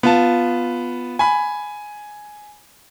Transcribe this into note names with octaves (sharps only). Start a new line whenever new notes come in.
B3 F4 A5
G#5 B5